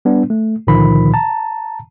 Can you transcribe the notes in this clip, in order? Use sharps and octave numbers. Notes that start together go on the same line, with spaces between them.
G3 B3 D4
A3
C#2 A#2 D3 D#3 F3 B5
A5 A#5